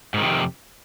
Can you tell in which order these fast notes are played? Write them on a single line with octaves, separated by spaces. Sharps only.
G#2 D#3 C3 F2